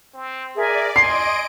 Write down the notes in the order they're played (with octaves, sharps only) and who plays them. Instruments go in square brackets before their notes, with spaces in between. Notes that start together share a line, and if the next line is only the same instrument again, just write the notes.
[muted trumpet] C4
[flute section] G#4 A#4 E5 [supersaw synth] D5 [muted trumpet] G#5
[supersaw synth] D#5 D7 [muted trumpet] G#5 [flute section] C6 [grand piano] C7